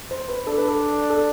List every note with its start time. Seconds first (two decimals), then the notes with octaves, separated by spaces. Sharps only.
0.11 C5
0.28 B4
0.47 D4 A4
0.58 B4
0.68 A4
1.10 A4